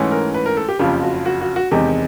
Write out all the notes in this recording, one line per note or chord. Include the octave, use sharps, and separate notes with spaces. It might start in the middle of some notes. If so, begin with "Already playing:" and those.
Already playing: G#2 E3 A3 C#4
A#4
B4
A#4
A4
G4
F#1 F2 C#3 F3 G4
F#4
F#4
F#4
F#4
E1 E2 C3 D#3 G#3 G4